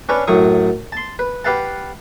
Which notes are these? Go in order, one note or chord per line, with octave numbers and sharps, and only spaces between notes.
C#4 D4 B4 C#5
F#2 A2 F#3 C#6 D#6
A5 C6
B4
G4 B4 F5 F#5 A5